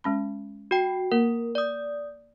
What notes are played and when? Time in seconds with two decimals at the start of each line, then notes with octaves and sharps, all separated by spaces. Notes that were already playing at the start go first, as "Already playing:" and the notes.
0.04 G#3 C#4 B5
0.71 F#4 G5
1.12 A#3 A#4
1.55 D5 D#6